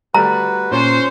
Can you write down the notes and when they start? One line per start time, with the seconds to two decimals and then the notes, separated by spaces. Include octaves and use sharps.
0.14 G3 A3 F#4 B4 A#5
0.72 A#2 C#4 C5 C#5 C6